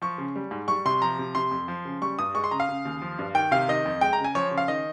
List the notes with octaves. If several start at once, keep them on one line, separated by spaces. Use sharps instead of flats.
F3 C#6
C#3
G3
G#2
G3 C#6
C3 C6
F3 A#5
C3
C3 C6
F2
F3
C#3
G3 C#6
G2 D#6
G#3 C#6
C6
C#3 A#5
F5
C#3
D#2
F3
G2
D#3 G5
C3 F5
D#3 D#5
F2
G#3 G5
A#5
C#3
G#5
F3 C#5
C#3
F5
D#3 D#5